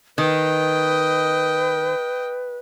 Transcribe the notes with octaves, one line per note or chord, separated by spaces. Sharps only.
D#3 B4 D#5 G5